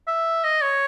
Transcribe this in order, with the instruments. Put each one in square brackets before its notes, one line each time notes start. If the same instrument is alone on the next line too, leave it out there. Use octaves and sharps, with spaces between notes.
[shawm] E5
D#5
C#5